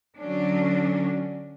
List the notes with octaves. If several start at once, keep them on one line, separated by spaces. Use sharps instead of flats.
D3 F#3 C#4 D4